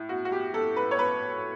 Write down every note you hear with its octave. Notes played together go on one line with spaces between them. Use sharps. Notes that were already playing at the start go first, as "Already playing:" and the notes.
Already playing: A2
F#4
F#4
G4
A4
B4
C#5
B4